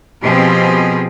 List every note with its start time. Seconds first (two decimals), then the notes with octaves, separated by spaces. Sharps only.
0.21 B2 F3 C4 G4 G#4